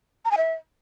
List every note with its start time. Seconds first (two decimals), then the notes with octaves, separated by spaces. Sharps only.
0.25 A#5
0.31 G#5
0.38 E5